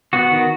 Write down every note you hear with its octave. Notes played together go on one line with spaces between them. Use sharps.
B3 F#4
D#3